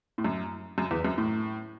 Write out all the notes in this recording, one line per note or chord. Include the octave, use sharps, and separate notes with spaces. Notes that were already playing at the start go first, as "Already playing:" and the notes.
A2
F#2
F#2
E2
F#2
A2